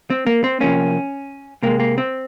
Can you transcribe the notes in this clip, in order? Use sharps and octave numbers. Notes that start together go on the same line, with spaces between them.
C4
A#3
C4
C3 F3 A#3 C#4
C3 F3 G#3 A#3
A#3
C4